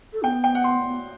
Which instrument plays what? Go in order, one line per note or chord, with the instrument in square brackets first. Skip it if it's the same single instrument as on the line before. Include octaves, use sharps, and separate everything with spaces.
[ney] A4
[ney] B3 [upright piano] G5
[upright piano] G5
F#5
C6